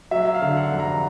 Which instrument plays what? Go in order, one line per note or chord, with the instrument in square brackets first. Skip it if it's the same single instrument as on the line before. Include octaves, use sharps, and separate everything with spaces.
[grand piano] F#3 E5
F5
D3
F#5
F1
A#5